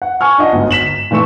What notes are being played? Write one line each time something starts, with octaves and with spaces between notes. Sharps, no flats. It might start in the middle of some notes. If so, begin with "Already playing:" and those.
F#5
G#5 C#6 F6
D4 F4 D#5 F#5
G1 D2 G#2
B6 E7 F#7
A#2 E3 A3 C#6 E7